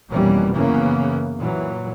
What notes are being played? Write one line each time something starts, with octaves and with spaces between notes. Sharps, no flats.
F1 B2 E3 G3 A#3 C#4
F#2 C#3 E3 A#3 B3
A#2 E3 F#3